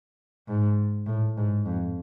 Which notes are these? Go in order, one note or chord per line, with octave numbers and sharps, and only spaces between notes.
G#2
A2
G#2
F2